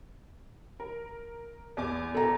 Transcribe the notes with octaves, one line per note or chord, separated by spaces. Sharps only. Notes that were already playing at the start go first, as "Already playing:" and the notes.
A#4
E2 G#5 D6
A4 A#5